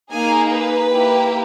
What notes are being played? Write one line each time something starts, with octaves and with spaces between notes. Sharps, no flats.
A#3 D#4 G#4 G#5
B4
A#3 E4 G4